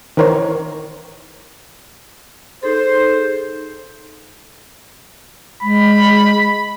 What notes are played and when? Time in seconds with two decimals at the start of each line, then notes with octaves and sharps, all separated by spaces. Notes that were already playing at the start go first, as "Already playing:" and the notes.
0.17 D#3 E3 A#4 C5 C#5
2.63 D#4 G#4 A4 C5
5.63 G#3 B5